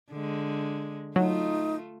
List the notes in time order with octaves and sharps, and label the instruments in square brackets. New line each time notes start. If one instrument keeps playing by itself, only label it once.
[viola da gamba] D3 G#3
[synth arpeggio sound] F#3 [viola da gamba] A3 F4 [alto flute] D#4